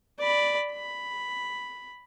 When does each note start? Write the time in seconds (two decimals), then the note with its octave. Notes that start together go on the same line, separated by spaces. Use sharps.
0.19 D5 B5
0.72 B5